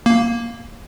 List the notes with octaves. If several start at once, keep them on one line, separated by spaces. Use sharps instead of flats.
A#3